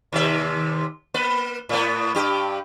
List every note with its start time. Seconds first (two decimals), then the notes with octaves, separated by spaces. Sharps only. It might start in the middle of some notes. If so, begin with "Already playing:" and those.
0.13 D#2 C3 E5
1.14 A#3 B4
1.69 A2 B3
2.15 G2 G4